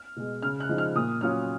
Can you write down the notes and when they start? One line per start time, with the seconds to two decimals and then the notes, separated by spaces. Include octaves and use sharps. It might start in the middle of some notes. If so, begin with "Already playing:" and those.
Already playing: F6
0.16 B2 G#3
0.42 C#3 F6
0.60 F#6
0.69 F3 G#3 D#4
0.78 F6
0.95 A#2 D#6
1.21 F#3 C#4 F4 F6